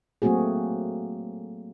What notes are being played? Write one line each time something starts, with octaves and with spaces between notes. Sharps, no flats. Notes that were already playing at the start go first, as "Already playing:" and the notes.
F#3 A3 A#3 C4 F#4 G#4